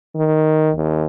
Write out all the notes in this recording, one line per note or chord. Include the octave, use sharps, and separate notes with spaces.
D#3
D#2